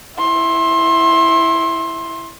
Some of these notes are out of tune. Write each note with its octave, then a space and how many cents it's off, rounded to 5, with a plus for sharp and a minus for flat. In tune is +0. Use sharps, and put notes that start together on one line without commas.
E4 +0 C6 +25